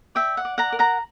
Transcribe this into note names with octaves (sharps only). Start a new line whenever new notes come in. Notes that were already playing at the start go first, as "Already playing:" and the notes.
D5 E5 G5
F#5
D5
F#5 A#5
A#4
F#5 A#5